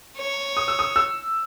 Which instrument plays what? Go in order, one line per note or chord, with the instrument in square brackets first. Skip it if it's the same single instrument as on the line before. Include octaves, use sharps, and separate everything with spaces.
[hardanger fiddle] C#5
[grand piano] D#6
E6
D#6
E6